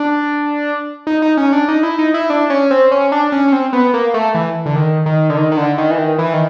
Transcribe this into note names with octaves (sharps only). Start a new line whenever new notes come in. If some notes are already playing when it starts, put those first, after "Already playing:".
Already playing: D4
D#4
D#4
C#4
D4
D#4
E4
D#4
E4
D4
C#4
C4
C#4
D4
C#4
C#4
C4
B3
A#3
A3
E3
D3
D#3
D#3
D3
D#3
D#3
D3
D#3
E3
D#3
E3
D#3